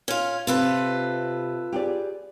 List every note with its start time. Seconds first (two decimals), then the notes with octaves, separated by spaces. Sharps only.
0.08 C#4 F4
0.47 C3 F4 A4 B4
1.72 G4 G#4 D5